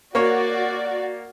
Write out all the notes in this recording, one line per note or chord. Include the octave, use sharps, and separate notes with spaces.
A#3 F#4 C#5 D5